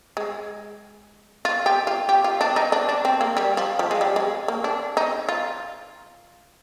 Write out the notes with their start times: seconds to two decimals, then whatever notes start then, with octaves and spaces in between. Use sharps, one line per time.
0.17 G#3
1.45 F4
1.66 G4
1.87 F4
2.09 G4
2.24 F4
2.41 D4
2.56 D#4
2.72 D4
2.89 D4
3.05 C4
3.21 A#3
3.37 G3
3.57 F3
3.79 F3
3.91 G#3
4.01 G3
4.16 G#3
4.48 A#3
4.64 D4
4.97 D#4
5.29 F4